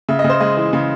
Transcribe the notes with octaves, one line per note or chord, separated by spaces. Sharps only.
C#3 E5
D#5
C#3
C5
G#3 D#5
E3
C#3